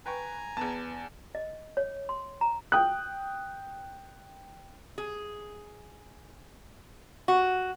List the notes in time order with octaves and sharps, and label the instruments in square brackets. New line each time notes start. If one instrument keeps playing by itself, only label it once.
[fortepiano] B4 G5 C#6 [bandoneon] G#5 A#5
[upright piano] E2 A5 [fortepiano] B3
[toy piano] D#5
C#5
C6
A#5
[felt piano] G5 D#6 F#6
[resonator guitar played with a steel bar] G#4
F#4